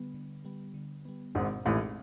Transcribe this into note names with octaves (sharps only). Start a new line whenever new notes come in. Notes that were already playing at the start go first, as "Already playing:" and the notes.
Already playing: D3 G3 B3
D3
G3 B3
D3
G3 B3
G#1 G#2 B2
A1 A2 G#3 C4 D#4 G#4